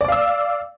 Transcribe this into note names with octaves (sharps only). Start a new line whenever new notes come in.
D5 F5 D6 E6